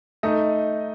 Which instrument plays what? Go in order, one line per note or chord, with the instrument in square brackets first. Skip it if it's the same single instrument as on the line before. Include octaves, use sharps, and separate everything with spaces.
[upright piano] A3 D#4 D#5